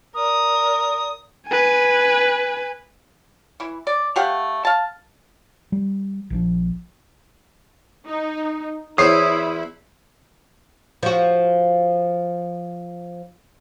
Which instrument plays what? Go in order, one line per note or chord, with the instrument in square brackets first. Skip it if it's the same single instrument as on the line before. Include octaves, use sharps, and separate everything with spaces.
[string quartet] A#4 D5 [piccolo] D#6
[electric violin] B4 G#5
[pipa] E3 E4
D5
A3 G4 F5 F#5
F5 A5
[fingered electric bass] G3
A#1 D#3 F3
[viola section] D#4
[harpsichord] E2 C5 [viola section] E4 [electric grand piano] C#5 C7 [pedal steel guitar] D#6
[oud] F3 F#4